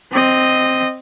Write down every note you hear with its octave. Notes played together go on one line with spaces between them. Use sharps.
C4 D#5